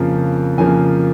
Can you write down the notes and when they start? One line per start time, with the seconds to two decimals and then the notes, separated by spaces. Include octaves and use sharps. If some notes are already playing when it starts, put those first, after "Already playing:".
Already playing: F2 C#3 F3 A#3
0.58 F2 C#3 F3 A#3 G#5